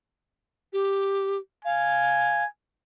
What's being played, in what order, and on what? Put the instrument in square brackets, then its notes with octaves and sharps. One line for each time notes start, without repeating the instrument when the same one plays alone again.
[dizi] G4
[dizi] F5 [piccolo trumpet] G#5